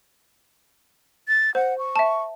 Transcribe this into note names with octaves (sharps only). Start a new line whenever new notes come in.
A6
C5 F#5
C#6
E5 A5